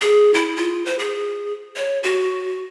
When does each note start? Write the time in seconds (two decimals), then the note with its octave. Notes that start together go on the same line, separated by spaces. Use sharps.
0.01 G#4
0.34 E4
0.56 F4
0.86 C5
0.99 G#4
1.76 C#5
2.03 F#4